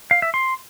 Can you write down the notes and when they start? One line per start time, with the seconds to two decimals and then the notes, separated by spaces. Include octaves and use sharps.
0.11 F5
0.22 E5
0.34 C6